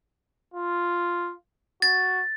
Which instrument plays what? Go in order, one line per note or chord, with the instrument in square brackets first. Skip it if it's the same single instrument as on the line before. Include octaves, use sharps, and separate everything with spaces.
[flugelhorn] F4
[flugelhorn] F#4 [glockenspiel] A6